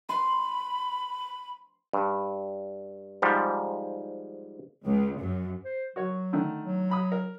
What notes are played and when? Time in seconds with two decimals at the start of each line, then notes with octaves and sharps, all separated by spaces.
0.09 B5 C6
1.93 G2
3.22 G#2 F3 G3
4.84 C#2
5.21 F#2
5.65 C5
5.96 F#3 F#4 A#4 C#5
6.33 D3 D#3 A3
6.63 F#3
6.90 A#5 B5 D#6
7.12 A#4